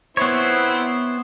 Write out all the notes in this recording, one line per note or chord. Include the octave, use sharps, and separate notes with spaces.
B3 C4 E4 C5 C#5